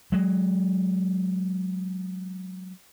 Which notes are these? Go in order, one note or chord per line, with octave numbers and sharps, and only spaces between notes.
F#3 G#3